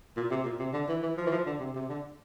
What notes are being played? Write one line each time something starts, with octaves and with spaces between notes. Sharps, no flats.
A#2
C3
A#2
C3
D3
E3
E3
F3
E3
F3
D3
C3
C3
D3